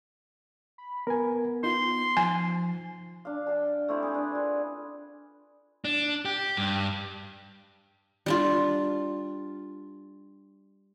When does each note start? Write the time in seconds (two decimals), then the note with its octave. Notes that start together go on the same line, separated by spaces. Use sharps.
0.78 B5
1.07 B3 A#4 G#5
1.64 D#4 F4 C6
2.17 F3 G#5
3.25 D4 F5
3.46 F5 G5 A5
3.88 A3 C4 E4 G4
4.03 G#4
4.14 D4 B4
4.35 F4
5.85 D4
6.25 G4
6.57 G2
8.26 G3 D4 F4